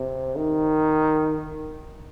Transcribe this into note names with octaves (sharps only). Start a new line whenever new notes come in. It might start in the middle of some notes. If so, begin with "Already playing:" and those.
Already playing: C3
D#3